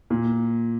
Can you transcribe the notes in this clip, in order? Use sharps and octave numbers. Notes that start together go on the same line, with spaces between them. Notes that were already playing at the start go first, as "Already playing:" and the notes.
A#2